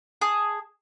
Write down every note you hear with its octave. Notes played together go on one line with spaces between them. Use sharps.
G#4 A5 D#6